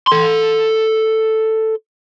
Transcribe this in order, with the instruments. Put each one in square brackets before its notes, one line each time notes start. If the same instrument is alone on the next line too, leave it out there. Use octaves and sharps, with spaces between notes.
[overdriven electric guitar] A4 C6